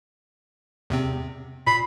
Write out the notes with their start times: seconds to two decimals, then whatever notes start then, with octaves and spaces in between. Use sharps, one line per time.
0.90 E2 C3 C4
1.67 A#2 B5 C7